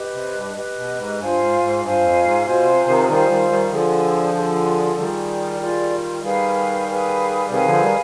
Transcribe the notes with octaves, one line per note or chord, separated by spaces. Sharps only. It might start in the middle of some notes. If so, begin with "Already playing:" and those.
Already playing: G4 B4 D#5
C3
G2
G4 B4 D#5
B2
G#2
G2 F4 C5 F5 G#5
G#2
G#2
G2 F4 C5 F5 G#5
F2
G#2
B2 F4 C5 F5 G#5
C3
C3 D#3
D#3 G3 F4 C5 F5 G#5
D#3 G3
D#3 G3
D3 F3 F4 G#4 D5 G5
F4 G#4 D5 G5
D#3 G3 F4 G#4 D5 G5
F4 G#4 D5 G5
D#3 G3 G#4 B4 F5 G#5
G#4 B4 F5 G#5
C3 D#3 G#4 B4 F5 G#5
D3 F3
D#3 G3